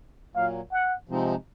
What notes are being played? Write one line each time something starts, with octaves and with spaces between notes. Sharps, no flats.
A#2 F#3 A#3 F5
F#5
C3 F3 G#3 C4 D#4